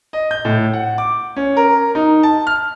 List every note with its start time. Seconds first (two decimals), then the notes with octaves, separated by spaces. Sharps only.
0.13 D#5
0.31 G6
0.45 A2
0.73 F#5
0.98 D6
1.36 C#4
1.57 A#4
1.95 D#4
2.23 A5
2.47 F6